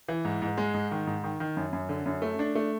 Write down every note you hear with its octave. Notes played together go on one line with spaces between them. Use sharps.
E3
G#2
G#2
G#3
G#2
D#3
G#2
D#3
D#3
F#2
F#2
D3
F#2
A3
D4
A3